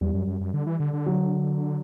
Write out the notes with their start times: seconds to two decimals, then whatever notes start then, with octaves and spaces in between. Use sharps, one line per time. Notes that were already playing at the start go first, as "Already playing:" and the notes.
0.01 E2 G3
0.14 F#2
0.27 F#2
0.41 F#2
0.54 D3
0.67 E3
0.80 D3
0.93 D3
1.06 F#3